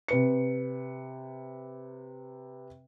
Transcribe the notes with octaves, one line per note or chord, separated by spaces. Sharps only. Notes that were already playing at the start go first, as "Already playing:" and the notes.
C3 B4 C#7